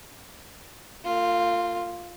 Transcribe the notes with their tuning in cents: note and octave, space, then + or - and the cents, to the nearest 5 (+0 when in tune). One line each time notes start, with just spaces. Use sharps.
A#3 -45 F4 +0